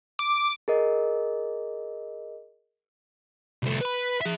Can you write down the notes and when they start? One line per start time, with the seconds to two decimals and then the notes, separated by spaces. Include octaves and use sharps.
0.19 D6
0.68 G#4 A#4 D#5
3.63 C2 A3
3.81 B4 B5
4.21 G#4 E5